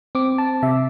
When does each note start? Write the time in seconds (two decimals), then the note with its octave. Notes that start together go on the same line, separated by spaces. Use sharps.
0.15 C4 D6
0.38 A5
0.62 C3 E5